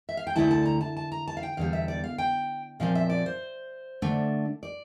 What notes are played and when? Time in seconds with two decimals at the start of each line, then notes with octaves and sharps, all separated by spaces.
0.09 E5
0.17 F5
0.27 G5
0.36 D2 D3 A3 E4 A5
0.51 A5
0.66 A#5
0.81 A5
0.97 A5
1.12 A#5
1.27 A5
1.37 F5
1.43 G5
1.57 E2 D3 G3 F5
1.73 E5
1.88 D5
2.04 F5
2.18 G5
2.80 A#2 F3 C4 F5
2.95 E5
3.10 D5
3.26 C5
4.02 D3 A3 D4
4.63 D5